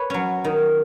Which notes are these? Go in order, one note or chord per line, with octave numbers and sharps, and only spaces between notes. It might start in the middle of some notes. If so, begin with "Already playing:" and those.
Already playing: B4 C#5
F#3 C#4
D#3